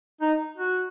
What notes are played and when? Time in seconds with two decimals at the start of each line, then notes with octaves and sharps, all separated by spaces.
0.21 D#4
0.57 F#4